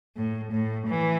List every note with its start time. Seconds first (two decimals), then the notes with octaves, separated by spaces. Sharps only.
0.16 A2
0.52 A2
0.88 E3